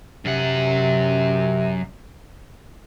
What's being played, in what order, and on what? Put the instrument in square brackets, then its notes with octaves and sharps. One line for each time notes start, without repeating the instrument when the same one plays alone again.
[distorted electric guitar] F#2 F#5 [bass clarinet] C3